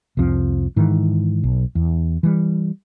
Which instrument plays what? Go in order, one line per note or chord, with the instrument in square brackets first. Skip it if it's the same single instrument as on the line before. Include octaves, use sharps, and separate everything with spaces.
[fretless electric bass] C2 F2 F3 C4
G#2 D#3 E3
B1
E2
E3 G3